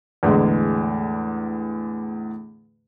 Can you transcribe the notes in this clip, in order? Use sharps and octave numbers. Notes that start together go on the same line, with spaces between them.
E2 A2 D3 G#3